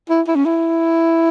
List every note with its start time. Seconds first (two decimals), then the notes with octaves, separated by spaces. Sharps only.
0.09 E4
0.27 E4
0.36 C#4
0.45 E4